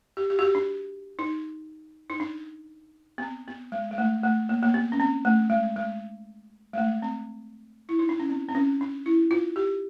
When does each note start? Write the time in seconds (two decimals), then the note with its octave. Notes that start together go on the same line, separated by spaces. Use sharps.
0.17 G4
0.30 G4
0.39 F#4
0.42 G4
0.55 D4
1.19 D#4
2.10 D#4
2.20 D4
3.18 B3
3.22 C4
3.48 B3
3.72 G#3
3.91 G#3
3.98 A3
4.23 A3
4.49 A#3
4.63 A#3
4.74 B3
4.92 C#4
5.00 C4
5.25 A3
5.50 G#3
5.76 G#3
6.73 G#3
6.78 A3
7.02 C4
7.89 E4
7.99 D#4
8.09 D4
8.20 C#4
8.30 C4
8.49 C4
8.55 C#4
8.81 D4
9.06 E4
9.31 F4
9.56 G4